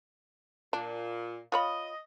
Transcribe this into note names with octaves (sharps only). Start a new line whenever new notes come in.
A#2 D4
F4 C#5 D#5 B5